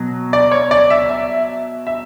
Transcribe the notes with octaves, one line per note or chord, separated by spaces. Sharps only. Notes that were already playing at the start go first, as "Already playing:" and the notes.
Already playing: B2 F#3
D5
C#5
D5
E5
E5
E5